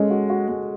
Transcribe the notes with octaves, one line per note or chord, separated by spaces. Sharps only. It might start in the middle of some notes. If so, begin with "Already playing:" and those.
Already playing: G#3 C#4 A4
F#4
F#4
G#3